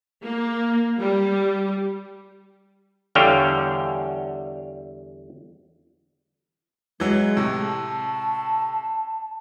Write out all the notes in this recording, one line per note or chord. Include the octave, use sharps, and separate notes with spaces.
A#3
G3
E2 D3 G3 C#5 F5 G5
E3 F#3 G#3
A2 C3
A5